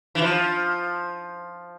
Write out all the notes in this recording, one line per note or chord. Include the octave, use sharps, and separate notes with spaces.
E3
F3